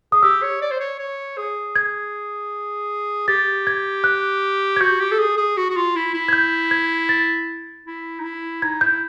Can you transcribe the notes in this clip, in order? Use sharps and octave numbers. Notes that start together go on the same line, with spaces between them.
G#4 D#6
G4 E6
C#5
D5
C5
C#5
C#5
G#4
G#6
G4 A6
G#6
F#6
G#6
F#4 G6
G4
A4
G#4
G#4
F#4
F#4
F4
E4
E4
G#6
G6
G#6
A6
E4
D#4
E4
D#4 G#6
E4 G6